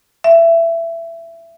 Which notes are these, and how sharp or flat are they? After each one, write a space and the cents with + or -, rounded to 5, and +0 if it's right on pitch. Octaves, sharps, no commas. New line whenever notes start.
E5 +20